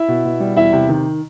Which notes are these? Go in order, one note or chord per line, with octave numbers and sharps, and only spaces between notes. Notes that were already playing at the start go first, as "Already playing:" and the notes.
Already playing: E4 E5
B2
B2
G3
E2 E4 E5
C3
D#3